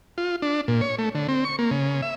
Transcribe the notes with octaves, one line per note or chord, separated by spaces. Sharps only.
F4
D4
A#2
C#5
A3
D3
C4
C#6
A#3
C#3
E5